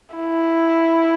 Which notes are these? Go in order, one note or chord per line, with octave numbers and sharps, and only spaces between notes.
E4